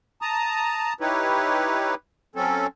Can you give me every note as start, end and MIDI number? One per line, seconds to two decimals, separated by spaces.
0.22 0.93 81
0.22 0.93 82
0.22 0.93 87
1.01 1.95 63
1.01 1.95 64
1.01 1.95 67
1.01 1.95 71
1.01 1.95 73
2.35 2.67 54
2.35 2.67 60
2.35 2.67 61
2.35 2.67 69